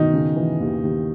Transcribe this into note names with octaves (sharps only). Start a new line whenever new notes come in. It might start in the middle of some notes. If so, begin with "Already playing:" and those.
Already playing: B2 D#3 D#4
C#3
E3
D#2
D#2